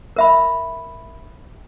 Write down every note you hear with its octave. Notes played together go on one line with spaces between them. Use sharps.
A#4 E5 B5